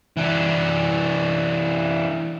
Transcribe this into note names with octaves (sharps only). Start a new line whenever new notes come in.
E3 D4